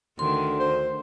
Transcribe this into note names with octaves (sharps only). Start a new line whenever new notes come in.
D2 D3 D#3 A3 C6
C5